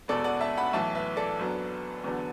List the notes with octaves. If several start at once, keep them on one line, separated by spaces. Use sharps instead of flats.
E1 E2 B2 A4 D5
D5 F#5
E5 A5
F#5 B5
B1 A2 E3 E5 A5
B4 E5
A4 D5
F#1 F#2 F#3 B3 D4
E2 D3 F#3 B3 D4